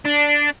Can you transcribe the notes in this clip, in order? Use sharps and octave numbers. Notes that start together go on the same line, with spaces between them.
D4